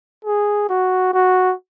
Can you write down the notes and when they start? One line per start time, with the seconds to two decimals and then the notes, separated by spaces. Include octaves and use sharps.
0.25 G#4
0.69 F#4
1.14 F#4